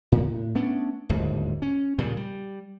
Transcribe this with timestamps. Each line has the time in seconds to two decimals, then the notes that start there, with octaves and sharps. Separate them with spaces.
0.12 A2
0.55 A3 B3 C#4 D4
1.09 D1 G1 D#2 G#2
1.62 C#4
1.98 A#2 C#3 F3 G3
2.17 G3